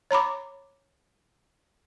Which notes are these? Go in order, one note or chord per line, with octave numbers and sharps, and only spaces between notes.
C#5 A#5 B5 D6